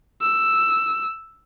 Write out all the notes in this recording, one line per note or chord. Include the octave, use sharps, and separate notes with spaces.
E6